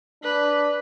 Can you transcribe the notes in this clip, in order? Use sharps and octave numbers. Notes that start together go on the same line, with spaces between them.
D4 B4